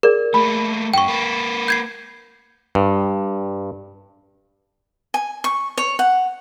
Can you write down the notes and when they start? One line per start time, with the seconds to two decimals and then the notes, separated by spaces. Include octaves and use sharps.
0.03 G#4 A#4 D5
0.34 A3 A#3 B5
0.94 F#2 G5 C#6
1.08 A#3 B4
1.68 G6 G#6 C7
2.75 G2
5.14 G#5
5.44 C#6
5.78 C#5
5.99 F#5